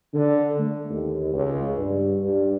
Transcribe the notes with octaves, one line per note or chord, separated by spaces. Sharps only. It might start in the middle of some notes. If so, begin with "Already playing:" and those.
D3
A3
D#2
C#2
G2
G2